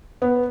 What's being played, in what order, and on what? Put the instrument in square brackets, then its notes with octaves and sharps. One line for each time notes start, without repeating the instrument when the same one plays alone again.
[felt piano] B3